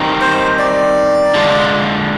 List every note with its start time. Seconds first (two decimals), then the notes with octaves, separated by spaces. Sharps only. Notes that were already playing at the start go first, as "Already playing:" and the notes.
Already playing: D#3 G3 C4 D#4
0.21 C5
0.59 D5
1.34 D3 G#3 D4 F4